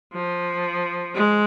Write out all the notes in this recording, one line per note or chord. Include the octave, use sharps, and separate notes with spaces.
F3
G#3